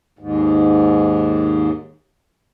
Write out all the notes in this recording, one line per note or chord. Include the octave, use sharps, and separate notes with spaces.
D#2 G#2